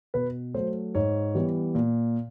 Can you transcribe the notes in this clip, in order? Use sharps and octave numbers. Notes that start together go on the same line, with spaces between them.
B2 B4
F#3 A3 C5
G#2 C#5
E3 G3 B3
A#2